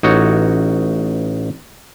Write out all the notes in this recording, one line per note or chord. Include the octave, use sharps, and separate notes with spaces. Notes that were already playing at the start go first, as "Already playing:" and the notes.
A1 D#4 F#4 C#5